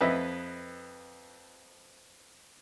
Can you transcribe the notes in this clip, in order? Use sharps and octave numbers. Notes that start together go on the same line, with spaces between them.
F2 B4 D#5 E5 B5